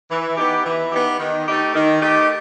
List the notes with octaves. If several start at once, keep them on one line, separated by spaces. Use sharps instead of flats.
E3
B3 D#4 G4
E3
B3 D#4 G4
D#3
A3 D#4 G4
D#3
A3 D#4 G4